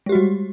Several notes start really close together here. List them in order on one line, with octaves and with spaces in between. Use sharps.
G#3 G4 F#4 G3